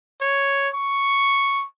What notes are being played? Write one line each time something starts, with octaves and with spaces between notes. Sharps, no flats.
C#5
C#6